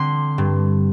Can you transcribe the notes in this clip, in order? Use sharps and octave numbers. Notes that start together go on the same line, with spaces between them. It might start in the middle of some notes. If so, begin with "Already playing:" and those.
Already playing: D3 C4 C6
G2